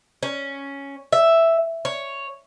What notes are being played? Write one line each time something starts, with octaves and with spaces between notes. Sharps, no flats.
C#4
E5
C#5